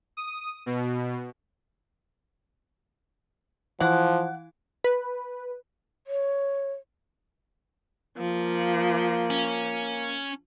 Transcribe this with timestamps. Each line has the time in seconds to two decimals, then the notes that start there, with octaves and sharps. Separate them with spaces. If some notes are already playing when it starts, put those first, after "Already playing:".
0.17 D#6
0.66 B2
3.80 E3 F3 E4 F5 F#5
4.84 B4
6.07 C#5
8.17 F3 A#3
9.30 C#4